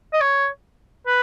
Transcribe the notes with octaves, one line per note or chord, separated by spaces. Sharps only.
D#5
C#5
B4